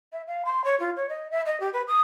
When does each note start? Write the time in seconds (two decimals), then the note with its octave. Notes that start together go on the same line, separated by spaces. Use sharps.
0.12 E5
0.27 F5
0.45 C6
0.64 C#5
0.79 F4
0.96 C#5
1.09 D#5
1.31 E5
1.46 D#5
1.60 G4
1.73 B4
1.87 D#6